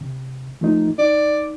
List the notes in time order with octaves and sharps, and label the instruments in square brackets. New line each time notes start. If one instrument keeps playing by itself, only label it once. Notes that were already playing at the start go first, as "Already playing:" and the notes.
[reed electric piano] C3
F3 A3 D#4
[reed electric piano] D#4 [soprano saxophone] D5